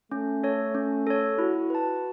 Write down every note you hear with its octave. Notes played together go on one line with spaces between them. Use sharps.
A3 C#4
A4 C#5
C#4
A4 C#5
E4 F#4
B4 A5